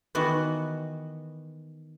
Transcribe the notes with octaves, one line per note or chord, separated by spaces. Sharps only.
D#3 E3 B3 F#4